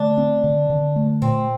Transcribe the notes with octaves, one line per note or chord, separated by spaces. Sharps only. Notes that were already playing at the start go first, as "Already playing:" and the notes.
Already playing: D3 A3 D4
C4
D3
D3
A3
A#2 C4